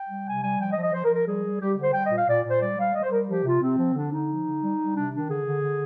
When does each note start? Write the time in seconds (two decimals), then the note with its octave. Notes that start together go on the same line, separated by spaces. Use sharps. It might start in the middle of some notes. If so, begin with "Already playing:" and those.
Already playing: G5
0.09 G3
0.26 C3 G#5
0.42 G3 G#5
0.59 F3 G5
0.71 D#5
0.76 F3
0.82 D#5
0.93 F3 C5
1.05 A#4
1.10 F3
1.15 A#4
1.26 G3 G#4
1.44 G3
1.60 G3 G4
1.77 D3
1.83 C5
1.94 G3 G5
2.05 D#5
2.11 A#2
2.17 F5
2.28 A#2 D5
2.44 A#2
2.50 C5
2.61 G3 D5
2.78 G3 F5
2.94 G3 D#5
3.03 C5
3.11 G3 A#4
3.28 F3 G4
3.44 C3 F4
3.61 C3 C4
3.78 F3
3.95 D3 D4
4.11 D3 D#4
4.29 F3
4.45 D3
4.63 G3
4.79 G3
4.96 C3 D4
5.13 D#3 D4
5.29 D3 G#4
5.46 D3
5.63 D3